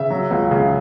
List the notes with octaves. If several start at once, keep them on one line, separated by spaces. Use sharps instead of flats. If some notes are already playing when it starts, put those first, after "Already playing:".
Already playing: C#3 E5
F#3
C#2
C#3